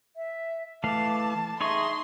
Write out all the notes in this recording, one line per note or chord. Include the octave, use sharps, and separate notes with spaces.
E5
E3 A3 F5 A5 D6
D#4 G#4 E5 C6 C#6